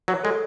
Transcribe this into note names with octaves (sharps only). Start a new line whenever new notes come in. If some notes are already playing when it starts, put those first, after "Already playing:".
F#3 C#5
G#3 A4